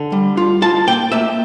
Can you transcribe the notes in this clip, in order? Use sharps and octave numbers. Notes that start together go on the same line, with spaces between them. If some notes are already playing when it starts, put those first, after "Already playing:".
Already playing: D3
G3
F4
F4 A5
A#3 G5
A#3 E5